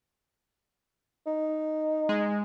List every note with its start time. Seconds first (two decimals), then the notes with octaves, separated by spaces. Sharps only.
1.27 D#4
2.09 G#3